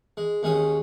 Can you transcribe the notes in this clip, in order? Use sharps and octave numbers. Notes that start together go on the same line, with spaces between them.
G#3
D#2 G#3 C#4 D#6